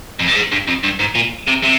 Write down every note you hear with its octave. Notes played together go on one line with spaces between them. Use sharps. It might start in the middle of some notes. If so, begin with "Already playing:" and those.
F2
G2
G#2
G2
F2
G2
G#2
A#2
C3
C3